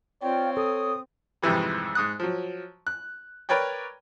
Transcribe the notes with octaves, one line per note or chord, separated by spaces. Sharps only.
C4 F4 C#5 D5 G5
A4 D#6
F2 G#2 C3 E3 G3
G#2 D#6 F#6
F3 F#3
F#6
A#4 B4 C#5 D5 G5